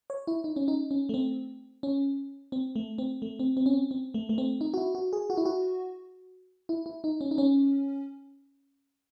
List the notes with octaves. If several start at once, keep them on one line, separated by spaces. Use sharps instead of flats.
C#5
E4
D#4
C#4
D#4
C#4
A3
C4
C#4
C4
A3
C4
A3
C4
C4
C#4
C4
C4
A3
A3
C4
D#4
F#4
E4
F#4
G#4
F#4
E4
F#4
E4
E4
D#4
C#4
D#4
C#4